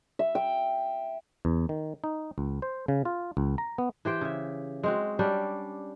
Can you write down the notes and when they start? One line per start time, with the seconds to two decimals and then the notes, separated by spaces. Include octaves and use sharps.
0.19 E5
0.35 G5
1.45 E2
1.69 D#3
2.04 D#4
2.38 C#2
2.62 C5
2.88 C#3
3.05 F4
3.37 C#2
3.58 A#5
3.78 B3
4.05 E3 G4 C5 G5
4.21 C#3 E5
4.83 G#3 C4 F#4
5.19 G3 C#4 D4 G4